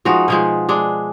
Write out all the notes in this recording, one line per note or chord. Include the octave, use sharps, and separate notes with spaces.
F3 G#3 D#4 F#4
B2 F3 G#3
G#3 D4